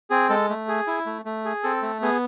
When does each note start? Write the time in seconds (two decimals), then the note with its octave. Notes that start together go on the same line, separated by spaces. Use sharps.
0.10 C4 G#4
0.29 G#3 A4
0.49 A3
0.68 G#4
0.87 E4
1.06 A3
1.25 A3
1.45 G#4
1.63 C4 A4
1.82 A3
2.02 B3 G#4